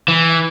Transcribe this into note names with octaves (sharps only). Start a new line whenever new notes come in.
E3